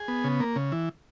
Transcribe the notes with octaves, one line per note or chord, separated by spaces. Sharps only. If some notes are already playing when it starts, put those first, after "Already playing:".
Already playing: G#4
B3
C#3
A#3
C#3
E3